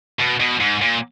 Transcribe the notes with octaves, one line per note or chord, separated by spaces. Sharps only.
B2
B2
G#2
A#2